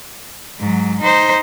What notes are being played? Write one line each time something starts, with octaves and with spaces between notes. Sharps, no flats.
G#2 F#3
D#4 C5